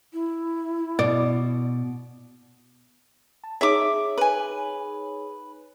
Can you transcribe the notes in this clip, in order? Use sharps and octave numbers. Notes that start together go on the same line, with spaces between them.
E4
B2 D5
A5
D#4 G#4 C#5 E5 D6
B4 G#5